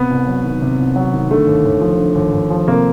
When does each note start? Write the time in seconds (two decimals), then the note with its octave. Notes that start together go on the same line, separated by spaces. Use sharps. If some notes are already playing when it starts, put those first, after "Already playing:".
Already playing: C3 B3
0.10 C2
0.27 F#3
0.44 D#3
0.62 C3
0.79 C2
0.96 F#3
1.13 D#3
1.30 D3 A3
1.47 D#2
1.65 D#2
1.81 F3
1.99 D3
2.15 D#2
2.32 D#2
2.50 F3
2.67 C3 A#3